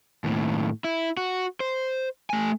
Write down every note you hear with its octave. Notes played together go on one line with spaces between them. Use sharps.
D#2 A2
E4
F#4
C5
A3 G#5